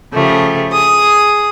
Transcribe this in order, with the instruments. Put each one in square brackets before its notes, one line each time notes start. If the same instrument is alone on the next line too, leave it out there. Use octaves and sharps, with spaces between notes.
[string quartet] C#3 F3 A3 G4
G#4 D#6